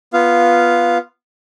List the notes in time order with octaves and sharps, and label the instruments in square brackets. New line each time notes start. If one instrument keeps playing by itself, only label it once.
[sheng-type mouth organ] B3 F4 F5